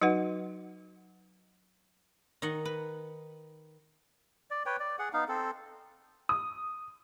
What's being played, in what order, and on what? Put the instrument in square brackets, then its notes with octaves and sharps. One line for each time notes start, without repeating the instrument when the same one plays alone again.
[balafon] F#3 D#4 F#4 B4 F#5
[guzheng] D#3 D#4 D#5 F#5
B4
[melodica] D5
B4 C#5 G5
D5
G#4 F#5
B3 D#4 F5
C4 A4
[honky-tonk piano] D#6